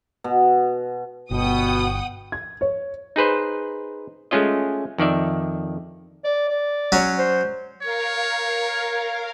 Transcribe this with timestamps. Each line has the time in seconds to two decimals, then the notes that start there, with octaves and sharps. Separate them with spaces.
0.24 B2
1.31 G1 B2 F#5 G5 D#6
2.32 G#6
2.61 C#5
3.16 D#4 G#4 B4 C5
4.31 G#3 A3 C#4 F4 D#5
4.98 F2 D#3 D5 E5
6.24 D5
6.49 D5
6.92 F#3 C#4
7.18 C5
7.82 A#4 C#5 F5